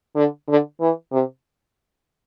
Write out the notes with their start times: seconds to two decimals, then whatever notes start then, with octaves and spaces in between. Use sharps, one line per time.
0.16 D3
0.49 D3
0.81 E3
1.13 C3